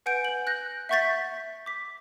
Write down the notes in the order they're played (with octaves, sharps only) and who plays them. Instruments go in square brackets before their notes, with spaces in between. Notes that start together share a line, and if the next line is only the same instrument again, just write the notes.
[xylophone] B4 F#5 G#5 G6 D7
G6 F#7
F#6 G6 A#6
E5 F#5 C#6 G6 A6 B6
D6 B6